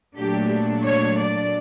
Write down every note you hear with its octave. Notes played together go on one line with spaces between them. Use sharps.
A#2 F#3 A3 D4 G4
C#5
D5